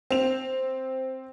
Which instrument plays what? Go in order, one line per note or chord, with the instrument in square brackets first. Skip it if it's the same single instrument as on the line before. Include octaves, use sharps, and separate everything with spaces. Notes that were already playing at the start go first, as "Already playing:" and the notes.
[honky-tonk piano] C4 F7